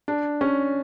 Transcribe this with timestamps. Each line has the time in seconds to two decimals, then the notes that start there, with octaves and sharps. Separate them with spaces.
0.08 D4
0.41 C#4